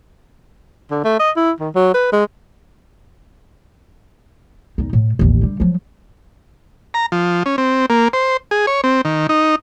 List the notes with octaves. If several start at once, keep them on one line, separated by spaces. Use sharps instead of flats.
D3
A3
D#5
E4
D#3
F#3
B4
G#3
E2 D#4
A2
A1 D#2
D3 G3
F3 F#3
A#5
F3
C#4
C4
A#3
C5
G#4
C#5
C4
D#3
D#4